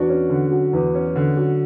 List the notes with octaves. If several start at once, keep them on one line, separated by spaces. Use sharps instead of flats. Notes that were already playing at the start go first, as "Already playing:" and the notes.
Already playing: E2 D4 F#4
C#4
D3
F#3
E2
C#4
D3
F#3